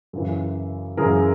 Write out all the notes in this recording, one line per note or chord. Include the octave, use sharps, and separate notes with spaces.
F#2 C#3 E3
F#2 C#3 E3 G#4 A#4